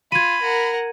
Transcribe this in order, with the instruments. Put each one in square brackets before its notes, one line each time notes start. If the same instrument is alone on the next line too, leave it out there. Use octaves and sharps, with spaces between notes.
[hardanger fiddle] F4 [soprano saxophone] B5 [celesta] G#6 D#7
[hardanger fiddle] A#4 F#5